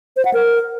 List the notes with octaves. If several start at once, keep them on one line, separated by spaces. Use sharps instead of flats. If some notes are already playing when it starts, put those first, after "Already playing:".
C5
F#5
A#4